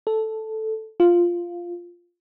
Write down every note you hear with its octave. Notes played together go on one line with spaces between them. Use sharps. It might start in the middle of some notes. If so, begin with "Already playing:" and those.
A4
F4